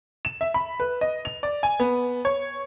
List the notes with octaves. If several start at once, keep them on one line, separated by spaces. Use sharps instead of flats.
E7
E5
B5
B4
D#5
F7
D5
G#5
B3
C#5